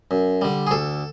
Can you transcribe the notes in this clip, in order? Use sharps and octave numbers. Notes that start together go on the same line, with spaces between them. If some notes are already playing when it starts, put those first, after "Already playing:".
F#2
D3 G3
G#4
D2 A4